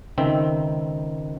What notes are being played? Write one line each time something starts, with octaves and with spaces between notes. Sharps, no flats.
C#2 D#3 C4 E5